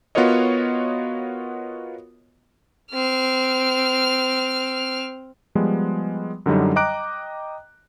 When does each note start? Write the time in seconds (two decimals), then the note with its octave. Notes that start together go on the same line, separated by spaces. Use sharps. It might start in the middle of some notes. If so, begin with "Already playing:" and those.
0.15 B3 F4 F#4 A#4 C#5 D#5
2.91 C4 F6
5.55 F3 G3 G#3 B3
6.46 F#2 D3 F#3 G3 D#4
6.76 D#5 G5 A#5 D6 F#6 D7